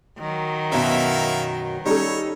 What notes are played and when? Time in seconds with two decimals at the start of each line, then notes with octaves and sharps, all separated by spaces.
0.19 D#3 F#3
0.72 F#2 B2 E4 E5 F5
1.86 G3 C#4 D#4 A4 C#5